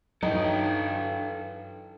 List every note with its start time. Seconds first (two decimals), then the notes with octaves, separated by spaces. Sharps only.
0.23 G2 F#3 D#4 E4 A4 B4 G5